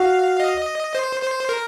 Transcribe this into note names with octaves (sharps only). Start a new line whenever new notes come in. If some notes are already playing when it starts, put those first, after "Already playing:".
Already playing: F#4 F5
D#5
C5
C5
A#4